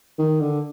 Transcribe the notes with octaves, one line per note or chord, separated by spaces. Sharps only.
D#3
D3